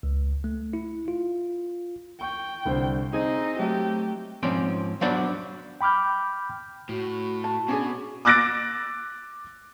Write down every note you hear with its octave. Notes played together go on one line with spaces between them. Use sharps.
C#2
A3
E4
F4
G5 C#6
C2 D3 C5
C4 D#4 G#4 D#5 G#5
F#3 A3 G4
G#2 F3 C4 C#4 D5
F#3 B3 D4 C5 D5 F#5
G5 B5 D6 F6 G6
A2 F#4
A5
B2 C#4 D4 G#4
D6 E6 F#6 A6 A#6 D7